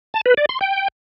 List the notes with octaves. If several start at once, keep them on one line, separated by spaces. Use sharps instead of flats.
A5
B4
D5
C6
G5